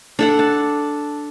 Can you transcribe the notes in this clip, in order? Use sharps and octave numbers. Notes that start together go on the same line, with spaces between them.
D4 A4 F#5
A5